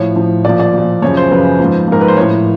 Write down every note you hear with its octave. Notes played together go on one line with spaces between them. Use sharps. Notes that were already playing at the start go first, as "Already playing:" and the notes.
Already playing: A2 F3 C#5
A2 F3
A#2 F3 D5
D5
A#2 F3
F#2 C#3 F3 C#5
C5
F#2 C#3 F3 B4
G#2 F3
G#2 F3 A#4
B4
C5
A2 F3 C#5